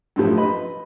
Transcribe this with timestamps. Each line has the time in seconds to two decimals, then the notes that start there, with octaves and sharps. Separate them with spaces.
0.16 F#2 A2 F3
0.37 B4 D#5 B5